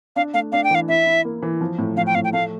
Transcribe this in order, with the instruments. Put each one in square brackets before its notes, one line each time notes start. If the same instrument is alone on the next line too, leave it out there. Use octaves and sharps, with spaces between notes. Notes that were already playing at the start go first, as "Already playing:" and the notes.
[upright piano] D4 [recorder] F5
[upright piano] A3 [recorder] F5
[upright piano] D4 [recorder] F5
[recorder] G5
[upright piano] E3 [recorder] F5
[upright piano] E4 [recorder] E5
[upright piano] E4
A#3
E3
F3
A2
[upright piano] F3 [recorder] F5
[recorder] G5
[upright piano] A2 [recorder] F5
[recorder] G5
[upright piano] A3 [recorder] F5